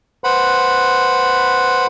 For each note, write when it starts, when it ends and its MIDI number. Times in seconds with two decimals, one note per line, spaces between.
0.24 1.87 71
0.24 1.87 72
0.24 1.87 78
0.24 1.87 83